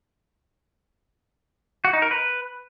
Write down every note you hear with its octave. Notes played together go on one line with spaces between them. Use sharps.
F#4
D#4
A#4
B4